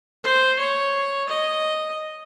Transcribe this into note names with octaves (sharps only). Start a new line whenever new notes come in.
C5
C#5
D#5